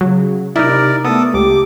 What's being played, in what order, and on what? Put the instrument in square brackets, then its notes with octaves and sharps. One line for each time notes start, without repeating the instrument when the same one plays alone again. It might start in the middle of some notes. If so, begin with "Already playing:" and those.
[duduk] C#3 [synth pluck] F#3
[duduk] C3 [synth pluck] D#4 E4 [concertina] A#4 D5
[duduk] A3 [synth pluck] B3 [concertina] A4 D#6
[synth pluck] C#2 [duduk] G4 [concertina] D6